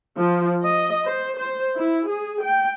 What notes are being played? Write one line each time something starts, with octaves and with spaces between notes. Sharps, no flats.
F3
D#5
C5
C5
E4
G#4
G5